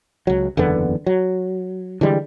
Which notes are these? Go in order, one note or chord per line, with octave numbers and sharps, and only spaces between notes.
C#2 F#3
F#1 E2 D3 B3
F#3
D3 E3 G3 G#3